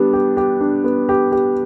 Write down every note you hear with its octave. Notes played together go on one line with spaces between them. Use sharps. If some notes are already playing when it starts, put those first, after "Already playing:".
Already playing: G3 B3 D4
G4
G4
D4
B3
G4
G4